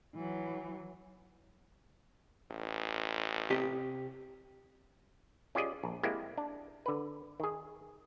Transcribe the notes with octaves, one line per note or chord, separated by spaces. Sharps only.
E3 F#3
A1
C3 G4 D#5
C#4 F4 G4 G#4 D5 D#5
A#1
G#3 A#3 C4 E4 G4
D4
D3 B4
D#3 G#4